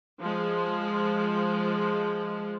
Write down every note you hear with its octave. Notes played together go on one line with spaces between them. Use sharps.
F3 G#3